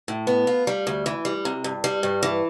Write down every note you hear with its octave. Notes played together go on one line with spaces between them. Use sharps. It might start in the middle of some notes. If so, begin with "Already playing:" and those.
A2
B3
F4
G3
D2
E3
G3
C3
G2
G3
G2
E3